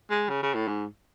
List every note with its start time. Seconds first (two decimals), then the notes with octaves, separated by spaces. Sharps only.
0.10 G#3
0.29 C#3
0.43 C#3
0.55 A2
0.68 G#2